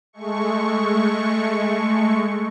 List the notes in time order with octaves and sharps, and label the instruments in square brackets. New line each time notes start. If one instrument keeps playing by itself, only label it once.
[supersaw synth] G#3 A3 C#6